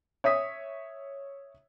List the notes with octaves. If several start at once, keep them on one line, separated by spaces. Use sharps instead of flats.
C#5 E5 D#6 B6